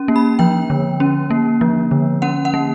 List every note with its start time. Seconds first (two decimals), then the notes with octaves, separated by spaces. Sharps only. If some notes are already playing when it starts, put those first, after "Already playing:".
Already playing: C#4
0.08 A#3
0.16 B5
0.39 F3 G5
0.70 D3
1.00 C#4
1.30 A#3
1.61 F3
1.91 D3
2.22 C#4 F#5
2.45 F#5
2.54 A#3